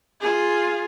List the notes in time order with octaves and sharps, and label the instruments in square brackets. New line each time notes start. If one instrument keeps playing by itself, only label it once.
[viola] F4 G#4